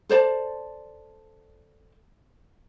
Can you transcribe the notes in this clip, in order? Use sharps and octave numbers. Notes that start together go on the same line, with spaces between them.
A4 C5 D5 A5